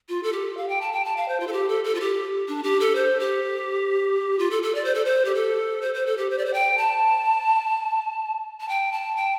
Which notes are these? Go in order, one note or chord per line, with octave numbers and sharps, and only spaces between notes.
F4
A4
G4
F5
G5
A5
G5
A5
F5
C5
F4
A4
G4
A4
A4
F4
G4
D4
G4
A4
C5
G4
F4
A4
A4
D5
C5
A4
C5
G4
A4
C5
C5
A4
G4
C5
D5
C5
G5
A5
A5
G5
A5
G5